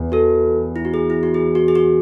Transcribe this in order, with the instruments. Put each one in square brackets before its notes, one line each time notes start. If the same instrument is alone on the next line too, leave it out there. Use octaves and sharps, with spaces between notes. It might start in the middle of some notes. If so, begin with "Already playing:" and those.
Already playing: [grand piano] E2
[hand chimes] F#4 A4
E4
F#4
G#4
E4
F#4
G#4
F#4
G#4
F#4